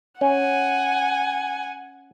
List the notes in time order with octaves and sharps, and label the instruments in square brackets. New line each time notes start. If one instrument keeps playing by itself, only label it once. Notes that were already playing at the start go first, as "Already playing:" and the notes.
[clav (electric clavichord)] C#4 [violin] F#5 G#5